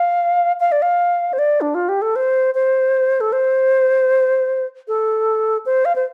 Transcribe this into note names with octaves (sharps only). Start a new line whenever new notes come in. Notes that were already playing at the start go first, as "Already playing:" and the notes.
Already playing: F5
F5
D5
F5
C5
D5
D4
F4
G4
A4
C5
C5
A4
C5
A4
C5
F5
C5